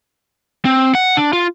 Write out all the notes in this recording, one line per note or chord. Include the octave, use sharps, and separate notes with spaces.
C4
F#5
D4
F4